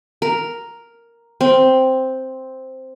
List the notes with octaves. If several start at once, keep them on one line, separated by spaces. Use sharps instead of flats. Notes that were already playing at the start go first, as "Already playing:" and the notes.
A#4
C4